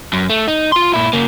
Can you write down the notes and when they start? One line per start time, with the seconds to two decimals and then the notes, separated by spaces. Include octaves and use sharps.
0.13 F#2
0.30 A3
0.48 D#4
0.72 F4 C6
0.94 A#2 E4
1.13 C#3 A#3